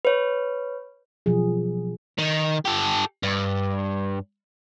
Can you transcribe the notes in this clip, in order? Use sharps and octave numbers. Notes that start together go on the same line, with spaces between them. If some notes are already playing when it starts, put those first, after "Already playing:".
B4 C#5
B2 F3 F#3 G#4
D#3
G4 A4
G2